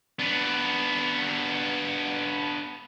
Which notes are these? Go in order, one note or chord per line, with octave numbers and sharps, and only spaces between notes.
B3 D4